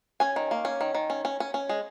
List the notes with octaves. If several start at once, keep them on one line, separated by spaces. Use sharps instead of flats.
C#4 G#5
D#3
A#3
C#4
D#3
D#3
C#4
C#4
C#4
C#4
G#3